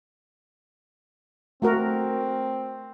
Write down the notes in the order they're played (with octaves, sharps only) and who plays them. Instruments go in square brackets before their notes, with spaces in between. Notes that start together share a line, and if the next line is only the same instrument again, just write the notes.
[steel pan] A3 F#4 A#4 [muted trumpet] C4